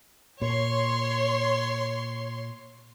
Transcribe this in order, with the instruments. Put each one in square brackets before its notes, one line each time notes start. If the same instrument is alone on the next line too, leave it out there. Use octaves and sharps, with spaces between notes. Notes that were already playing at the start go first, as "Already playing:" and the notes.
[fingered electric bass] A#2 [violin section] C#5 C6